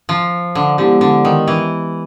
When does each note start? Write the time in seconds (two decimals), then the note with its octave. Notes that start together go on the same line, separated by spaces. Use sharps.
0.09 F3
0.55 D3
0.78 D3 G#3 B3 E4 G4
1.01 D3
1.25 D#3
1.48 E3